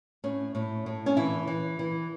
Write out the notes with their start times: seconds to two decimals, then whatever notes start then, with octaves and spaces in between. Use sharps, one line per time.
0.24 A2 C#4
0.55 A2
0.86 A2
1.06 C#4
1.17 E3 E4
1.47 E3
1.79 E3